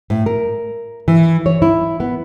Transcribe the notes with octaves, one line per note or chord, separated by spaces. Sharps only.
A2
A#4
E3
C#5
E4
B3